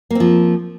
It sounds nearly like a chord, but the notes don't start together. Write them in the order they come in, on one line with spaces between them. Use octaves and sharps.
A#3 C4 F3